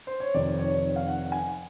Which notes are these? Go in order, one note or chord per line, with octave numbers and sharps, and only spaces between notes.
C5
C#5
F1 F2 C3 D#3 D5
C#5
F5
F#5
G#5